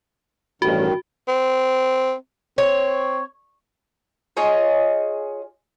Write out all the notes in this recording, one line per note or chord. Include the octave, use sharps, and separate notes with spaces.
A1 G2 D#3 F#4
C4
C4 C#5
F4 G#4 C#5 D#5